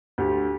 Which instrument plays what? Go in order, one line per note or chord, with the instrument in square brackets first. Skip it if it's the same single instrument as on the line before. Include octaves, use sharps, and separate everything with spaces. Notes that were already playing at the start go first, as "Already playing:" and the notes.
[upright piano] D2 G4